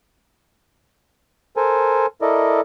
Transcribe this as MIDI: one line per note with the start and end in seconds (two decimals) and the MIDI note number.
1.57 2.06 69
1.57 2.06 70
1.57 2.06 72
1.57 2.06 80
2.22 2.61 64
2.22 2.61 69
2.22 2.61 70
2.22 2.61 74
2.22 2.61 75